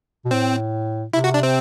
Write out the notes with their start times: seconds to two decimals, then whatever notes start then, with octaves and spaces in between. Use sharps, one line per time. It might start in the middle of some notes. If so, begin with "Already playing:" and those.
0.25 B2
0.31 A2 C4
1.13 C3 E4
1.24 F#4
1.34 D4
1.43 C4